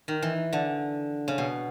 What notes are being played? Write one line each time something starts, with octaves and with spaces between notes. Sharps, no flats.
D#3
E3
D3
C#3
B2